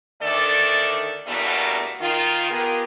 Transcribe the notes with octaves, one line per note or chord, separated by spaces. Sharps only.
D2 D#3 A3 A4 D5
E2 G2 B2 A3 A#3 F#4
D#3 F4
B3 F4 G4 G#4 A#4